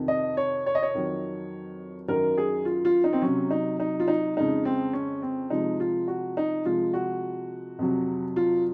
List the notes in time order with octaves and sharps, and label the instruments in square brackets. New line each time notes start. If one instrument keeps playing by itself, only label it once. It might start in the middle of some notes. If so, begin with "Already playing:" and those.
Already playing: [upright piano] F2 C3 D#3
D#5
C#5
C#5
D#5
C#5
F2 D#3 F#3
F#2 D#3 F#3 A#4
G#4
F4
F4
D#4
C4
C3 F#3 C#4
D#4
D#4
F4
D#4
F2 C#3 G#3 D#4
C4
C#4
C4
C3 F3 G#3 D#4
F4
F#4
D#4
C3 F3 G#3 F4
F#4
F2 C3 F#3
F4